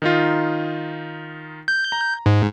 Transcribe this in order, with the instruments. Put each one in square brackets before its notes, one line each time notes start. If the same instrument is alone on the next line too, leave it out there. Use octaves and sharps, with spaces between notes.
[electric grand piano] D#3 D#4 F4
[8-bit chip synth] G6
[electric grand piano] A#5
[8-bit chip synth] G#2